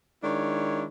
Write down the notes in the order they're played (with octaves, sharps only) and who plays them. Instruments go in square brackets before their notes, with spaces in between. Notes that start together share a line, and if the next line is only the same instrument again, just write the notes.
[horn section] D#3 G#3 D4 E4 C#5